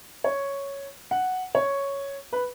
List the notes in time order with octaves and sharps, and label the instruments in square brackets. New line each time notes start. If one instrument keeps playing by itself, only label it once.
[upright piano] C#5
F#5
C#5
B4